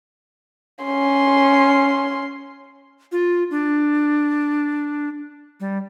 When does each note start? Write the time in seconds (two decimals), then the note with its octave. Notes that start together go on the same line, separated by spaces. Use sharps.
0.84 C#4 C6
3.12 F4
3.51 D4
5.60 G3